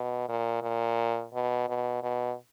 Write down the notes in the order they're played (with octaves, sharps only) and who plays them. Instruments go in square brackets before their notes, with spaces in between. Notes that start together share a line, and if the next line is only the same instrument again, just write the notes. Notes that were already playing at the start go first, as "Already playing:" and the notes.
Already playing: [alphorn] B2
A#2
A#2
B2
B2
B2